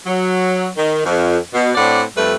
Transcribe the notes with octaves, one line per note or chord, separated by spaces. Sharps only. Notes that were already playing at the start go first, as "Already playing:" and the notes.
F#3
D#3
F2
B2
A2 C4 D4 D5 F#5
F2 G3 A3 A4 B4